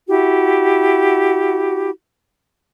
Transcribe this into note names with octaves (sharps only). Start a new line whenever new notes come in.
E4 F#4 G4